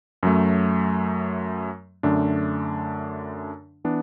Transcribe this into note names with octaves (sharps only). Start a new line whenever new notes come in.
F#2 F#3 A3
F#2 D3 A3 D4
E3 B3 D4